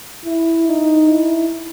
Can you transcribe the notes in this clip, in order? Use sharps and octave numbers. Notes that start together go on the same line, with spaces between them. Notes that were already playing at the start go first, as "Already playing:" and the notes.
E4
D#4
E4